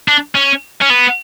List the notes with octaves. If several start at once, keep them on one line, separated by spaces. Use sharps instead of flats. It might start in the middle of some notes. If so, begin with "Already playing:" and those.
D4
C#4
C#4
B3